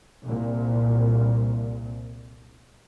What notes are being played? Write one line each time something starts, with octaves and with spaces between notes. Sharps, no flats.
C2 A#2